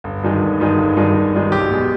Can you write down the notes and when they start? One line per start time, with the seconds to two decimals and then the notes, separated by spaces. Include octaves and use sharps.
0.04 G1
0.23 G2 D#3 G#3
0.41 G1
0.60 G2 D#3 G#3
0.78 G1
0.96 G2 D#3 G#3
1.15 G1
1.33 G2 D#3 G#3
1.52 B1 G4
1.71 B2 G#3